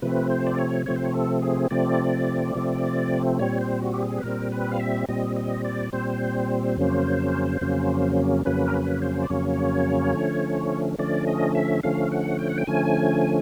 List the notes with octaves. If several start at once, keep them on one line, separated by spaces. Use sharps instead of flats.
C3 F3 A3 C4 B4
C5
D5
C#5
C3 F3 A3 C4 C#5
C5
C#5
A4
G#4
C3 F3 A3 C4 D5
C3 F3 A3 C4
A#2 G3 C4 C#5
C5
F#4
G4
G#4
B4
A#2 G3 C4 A#4
B4
F5
E5
A#2 G3 C4 D#5
D#5
D5
A#2 G3 C4 C5
F2 C#3 F#3 A#3 C#4
F2 C#3 F#3 A#3 C#4
F2 C#3 F#3 A#3 C#4 B4
A#4
B4
C5
D5
F2 C#3 F#3 A#3 C#4 C#5
D3 F3 A3 C#4
D3 F3 A3 C#4 D5
D#5
E5
D3 F3 A3 C#4 F5
F#5
G5
F#5
G5
D3 F3 A3 C#4 G#5